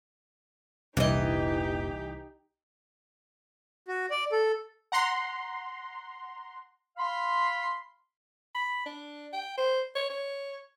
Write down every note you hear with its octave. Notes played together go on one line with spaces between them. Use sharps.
F1 C2 A#2 E3 D4 D#4 G4 D#5
F#4
D5
A4
F#5 A#5 C6
F5 B5 C6
B5
D4
G5
C5
C#5
C#5